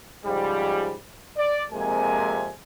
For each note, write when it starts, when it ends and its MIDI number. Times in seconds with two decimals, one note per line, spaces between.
0.25 0.94 44
0.25 0.94 49
0.25 0.94 53
0.25 0.94 55
1.38 1.62 74
1.72 2.52 41
1.72 2.52 48
1.72 2.52 56
1.72 2.52 58
1.72 2.52 80